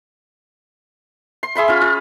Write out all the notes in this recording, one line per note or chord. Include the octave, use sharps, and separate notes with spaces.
C6
G#4 E5 B5 C6
C#4 F4
F4